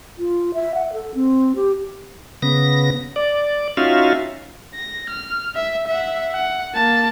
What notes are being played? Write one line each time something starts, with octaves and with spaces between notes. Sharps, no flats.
F4
E5
F#5
A4
C4
G4
C#3 B3 A#6
D5
C#4 D#4 F4 F#4 E5 F5
A#6
F6
E5
E5 F#5
F#5
A#3 A5